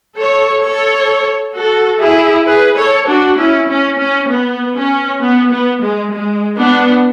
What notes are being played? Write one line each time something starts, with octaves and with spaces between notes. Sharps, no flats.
A4 C#5
A4 C#5
F#4 A4
E4 G#4
G#4 B4
A4 C#5
D4 F#4
C#4 E4
C#4
C#4
B3
C#4
B3
B3
G#3
G#3
B3 D4